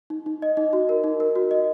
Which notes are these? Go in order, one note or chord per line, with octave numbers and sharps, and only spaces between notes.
D#4
D#4
D#5
D#4
F#4
A#4
D#4
A#4
F#4
D#5